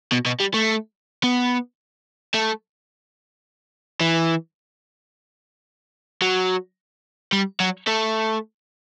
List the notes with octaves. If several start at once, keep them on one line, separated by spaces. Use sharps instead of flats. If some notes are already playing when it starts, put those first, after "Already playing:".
B2
B2
G3
A3
B3
A3
E3
F#3
G3
F#3
A3